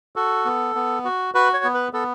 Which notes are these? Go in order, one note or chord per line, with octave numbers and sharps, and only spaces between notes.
F#4 A4
B3
B3
F#4
F#4 B4
C#5
B3
B4
B3 A4